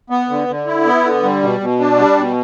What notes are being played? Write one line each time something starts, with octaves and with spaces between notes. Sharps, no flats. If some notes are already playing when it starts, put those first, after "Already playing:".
B3
D3
D3
E4
B3
D3
G3
B2
B2
D4
G3
B2